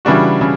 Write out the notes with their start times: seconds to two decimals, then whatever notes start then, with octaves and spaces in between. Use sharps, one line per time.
0.05 C#3 E3 G3 D4 F#4
0.41 C#3